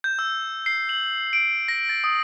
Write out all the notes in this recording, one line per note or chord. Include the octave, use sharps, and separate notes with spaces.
G6
E6
C7
F#7
D7
A#6
A6
D#6